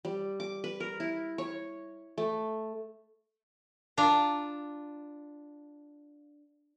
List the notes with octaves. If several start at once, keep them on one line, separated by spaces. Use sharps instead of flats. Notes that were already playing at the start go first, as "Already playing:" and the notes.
G3
D6
B4
A#4
E4
C#5
A3
D4 F4 A#5